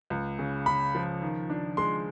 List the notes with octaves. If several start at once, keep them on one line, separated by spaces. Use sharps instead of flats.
C#2
C#3
C#3 B5
F3
D#3
D4
G#3 C6